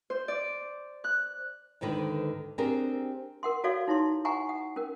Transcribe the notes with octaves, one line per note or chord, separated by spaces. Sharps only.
C5
D5
F#6
D2 G#2 D3 D#3 B4
C4 D4 G4 G#4 A#4 C5
A#4 F#5 C6
F#4 A4 C#5 D5 F5
D#4 E4 C#5 C6
F#5 G#5 A#5 C#6
F#5
C#4 A#4